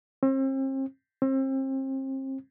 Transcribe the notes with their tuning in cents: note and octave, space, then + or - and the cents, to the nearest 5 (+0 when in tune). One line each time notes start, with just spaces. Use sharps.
C4 +40
C4 +35